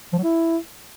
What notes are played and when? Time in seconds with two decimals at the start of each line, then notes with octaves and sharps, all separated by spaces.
0.13 F3
0.18 F#3
0.23 E4